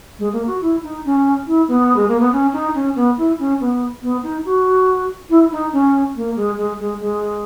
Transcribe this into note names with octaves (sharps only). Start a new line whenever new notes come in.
G#3
A#3
F#4
E4
D#4
C#4
E4
B3
G#3
A#3
B3
C#4
D#4
C#4
B3
E4
C#4
B3
B3
D#4
F#4
E4
D#4
C#4
A#3
G#3
G#3
G#3
G#3